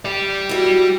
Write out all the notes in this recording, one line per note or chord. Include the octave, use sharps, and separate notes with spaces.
G4 D5
E4 F#4